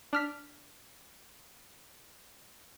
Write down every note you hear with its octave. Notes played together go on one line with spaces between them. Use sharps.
D4 F6 B6